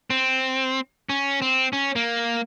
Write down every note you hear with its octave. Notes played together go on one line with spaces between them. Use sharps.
C4
C#4
C4
C#4
A#3